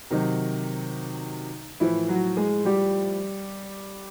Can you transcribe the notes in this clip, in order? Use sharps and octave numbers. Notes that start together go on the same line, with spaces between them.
C3 D#3 F#3 D#4
A2 E3 F3 E4
F#3 F#4
G#3 G#4
G3 G4